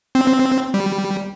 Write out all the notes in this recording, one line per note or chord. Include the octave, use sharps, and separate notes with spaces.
C4
G3